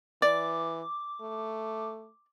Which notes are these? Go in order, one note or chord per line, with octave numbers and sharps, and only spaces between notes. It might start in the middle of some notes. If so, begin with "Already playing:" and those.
E3 D5 D6
A3